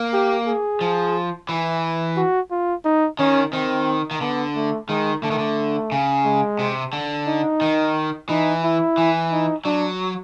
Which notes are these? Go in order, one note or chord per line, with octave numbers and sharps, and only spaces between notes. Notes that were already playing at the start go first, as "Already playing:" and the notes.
Already playing: A#3
G4
G#4
F3
E3
F#4
F4
D#4
D#3 C#4
D#3 C4
D#3
D3 B3
A3
D#3 G#3
D3 A3
D#3
D3
C#3
G#3
C3
D3
D#4
D#3
E3 D#4
E4
E3
D#4
F#3 D4